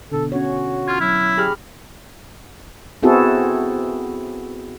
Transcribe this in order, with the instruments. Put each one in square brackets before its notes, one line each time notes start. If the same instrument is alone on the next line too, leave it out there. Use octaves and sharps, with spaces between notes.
[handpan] B2 D3 [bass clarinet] A4
[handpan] C#4 C#5 [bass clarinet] F#4
[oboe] F4 [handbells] F6 G#6
[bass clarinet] F#3 [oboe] E4
[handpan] G4 [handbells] G#4 B5 F6
[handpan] B3 C4 E4 F#4 G#4 A4